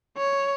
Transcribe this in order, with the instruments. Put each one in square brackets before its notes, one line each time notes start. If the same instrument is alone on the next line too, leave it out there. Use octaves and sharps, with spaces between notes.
[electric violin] C#5